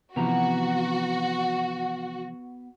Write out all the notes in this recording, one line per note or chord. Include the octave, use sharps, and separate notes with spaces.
C3 E3 F3 B3 F#4 A#5